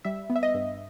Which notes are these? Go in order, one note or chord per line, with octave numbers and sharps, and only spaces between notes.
G3 E5
B3
E5
D#5
G2